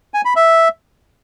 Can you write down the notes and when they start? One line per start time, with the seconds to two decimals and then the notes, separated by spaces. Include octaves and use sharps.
0.14 G#5
0.25 B5
0.36 E5